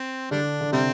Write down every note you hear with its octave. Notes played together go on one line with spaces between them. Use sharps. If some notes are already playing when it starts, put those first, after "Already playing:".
Already playing: C4
D3 G3 D4
D3
C3 G3 C4